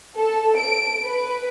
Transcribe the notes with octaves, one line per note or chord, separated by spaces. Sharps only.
A4
D7
B4